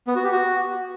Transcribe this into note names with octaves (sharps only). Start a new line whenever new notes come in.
B3
F#4
G4
F#4